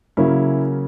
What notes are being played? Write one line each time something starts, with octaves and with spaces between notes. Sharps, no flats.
C#3 F#3 A#3 C#4 E4